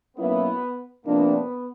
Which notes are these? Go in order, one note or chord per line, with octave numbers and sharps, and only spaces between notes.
B2 F#3 A#3 B3 C#4 E4
C3 F3 A#3 B3 D4